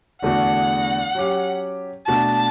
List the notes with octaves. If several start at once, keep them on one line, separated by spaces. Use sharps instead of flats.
E2 D3 A3 D4 F#4 F#5
F#3 C#4 G4
B2 A3 D4 F#4 A5